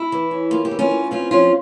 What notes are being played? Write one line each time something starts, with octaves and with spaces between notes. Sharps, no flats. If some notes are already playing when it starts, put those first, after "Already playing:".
Already playing: E4
E3
C#4
A#3 F4
G4
E3
C#4 F4
E3
C4 C#4 F4
F3 C#4 F4